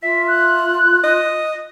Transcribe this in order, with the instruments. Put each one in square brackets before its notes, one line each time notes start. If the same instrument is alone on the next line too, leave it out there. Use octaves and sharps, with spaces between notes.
[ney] F4 [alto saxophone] E5 [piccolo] B6
[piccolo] F#6
[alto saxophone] D#5